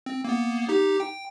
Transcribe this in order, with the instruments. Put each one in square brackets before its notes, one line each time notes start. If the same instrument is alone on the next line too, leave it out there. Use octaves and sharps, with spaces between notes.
[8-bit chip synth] C4
A#3 B3
D#4 G4
G5